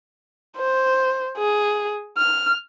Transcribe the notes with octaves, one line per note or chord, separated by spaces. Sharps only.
C5
G#4
F6